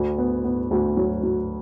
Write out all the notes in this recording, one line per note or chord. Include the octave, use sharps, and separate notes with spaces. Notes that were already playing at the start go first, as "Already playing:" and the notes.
Already playing: D2
B3
B3
D2
F#3
F#3